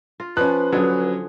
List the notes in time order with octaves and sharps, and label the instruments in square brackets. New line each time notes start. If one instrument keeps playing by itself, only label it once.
[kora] F4
[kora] F3 [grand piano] C#4 F#6 [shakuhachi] B4
[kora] D3 G#4 [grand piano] F#3 C#4